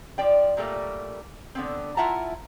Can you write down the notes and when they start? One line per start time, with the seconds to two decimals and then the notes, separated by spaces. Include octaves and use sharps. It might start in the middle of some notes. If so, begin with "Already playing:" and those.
0.18 F3 D5 G5
0.57 A#2 G3 A3 A#3
1.55 D3 B3 C4
1.97 E4 F4 E5 F#5 A5 A#5